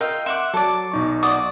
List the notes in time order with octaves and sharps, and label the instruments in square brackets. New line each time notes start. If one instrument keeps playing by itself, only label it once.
[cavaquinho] F4 G5 [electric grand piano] A#4 D#5 E6
[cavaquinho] E5 F#5 D6 [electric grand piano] C6
[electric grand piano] F#3 [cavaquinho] A4 D5
[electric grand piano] B1 D#4 C#6
[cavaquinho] F#4 D5 D#6